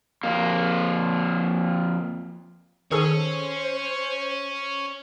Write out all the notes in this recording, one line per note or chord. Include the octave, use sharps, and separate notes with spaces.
F2 A#3
D#3 G#4 A4 C5 C#5 G#5